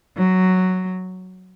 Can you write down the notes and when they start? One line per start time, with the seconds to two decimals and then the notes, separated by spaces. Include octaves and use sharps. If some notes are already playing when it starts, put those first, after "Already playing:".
0.18 F#3